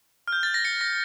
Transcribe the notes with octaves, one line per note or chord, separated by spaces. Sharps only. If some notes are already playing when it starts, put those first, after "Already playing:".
F6
G6
A6
A#6
C#7
A#6